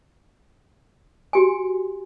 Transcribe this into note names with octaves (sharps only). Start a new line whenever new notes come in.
F#4 G4 G#5